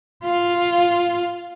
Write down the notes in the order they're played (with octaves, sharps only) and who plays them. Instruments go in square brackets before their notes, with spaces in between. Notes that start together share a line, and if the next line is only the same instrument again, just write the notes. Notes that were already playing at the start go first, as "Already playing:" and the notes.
[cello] F4